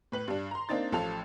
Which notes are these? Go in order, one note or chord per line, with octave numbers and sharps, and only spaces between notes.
A2 B4 F#7
G2 D4
A#5 C6
A#3 C4 D4 D#4 A6
A1 F3 A4 F7